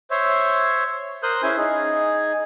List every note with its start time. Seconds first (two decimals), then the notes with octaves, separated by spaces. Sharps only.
0.11 C5 C#5 E5
1.23 A#4 C5 D#6 F#6 G6
1.43 C#4 E4 G#4 C5 G#5
1.57 D#4 G#4